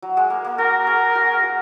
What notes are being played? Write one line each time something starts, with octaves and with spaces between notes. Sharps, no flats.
F#3
G#3
A#3
A#3
F#4 A#4
G#4
F#4
F#4